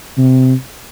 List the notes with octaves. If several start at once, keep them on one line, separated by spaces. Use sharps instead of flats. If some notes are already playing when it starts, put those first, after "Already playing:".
C3